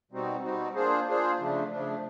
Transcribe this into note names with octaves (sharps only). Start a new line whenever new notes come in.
B2 G3 C4 D#4 F#4
B2 G3 C4 D#4 F#4
A#3 D4 F4 G#4 C5
A#3 D4 F4 G#4 C5
C#3 F3 A3 D4
C#3 F3 A3 D4